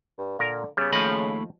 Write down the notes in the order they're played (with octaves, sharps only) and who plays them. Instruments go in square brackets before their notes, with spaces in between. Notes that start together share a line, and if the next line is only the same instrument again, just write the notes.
[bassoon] G2
[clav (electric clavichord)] A#2 A#4 A#5 [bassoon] D3
[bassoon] C#3 [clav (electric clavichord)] G3 B3
[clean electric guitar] D#2 A3 B5 [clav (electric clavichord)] F3 D#5